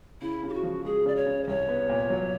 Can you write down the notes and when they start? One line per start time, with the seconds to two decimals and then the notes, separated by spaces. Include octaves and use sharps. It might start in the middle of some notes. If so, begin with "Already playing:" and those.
0.22 C#3 E4
0.43 C#3
0.49 G4
0.54 F#4
0.63 F3
0.85 G#3 G#4
1.05 C#3 D5
1.16 C#5
1.26 C#3
1.44 C5
1.47 C2 C#5
1.68 B3
1.89 A#2
2.10 F#3